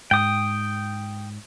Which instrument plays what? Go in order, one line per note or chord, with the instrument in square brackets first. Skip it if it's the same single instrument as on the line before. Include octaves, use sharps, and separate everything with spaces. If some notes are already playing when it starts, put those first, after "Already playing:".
[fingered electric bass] G#2 [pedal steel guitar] G5 D#6